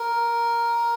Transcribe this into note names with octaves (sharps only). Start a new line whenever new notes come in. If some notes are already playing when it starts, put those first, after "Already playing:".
Already playing: A#4